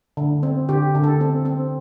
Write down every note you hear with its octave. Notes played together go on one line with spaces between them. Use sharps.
D3
C4
D3 G4
D3
A4
C4
C4